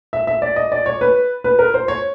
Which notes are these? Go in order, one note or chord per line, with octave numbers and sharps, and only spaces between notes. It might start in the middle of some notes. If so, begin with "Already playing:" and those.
E5
E5
D5
D#5
D5
C#5
B4
B4
A#4
C5
C#5